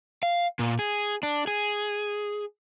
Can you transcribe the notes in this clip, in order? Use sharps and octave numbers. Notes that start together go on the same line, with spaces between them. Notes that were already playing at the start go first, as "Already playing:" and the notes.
F5
A#2
G#4
D4
G#4